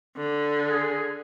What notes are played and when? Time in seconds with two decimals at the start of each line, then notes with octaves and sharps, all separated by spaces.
0.17 D3
0.68 G#4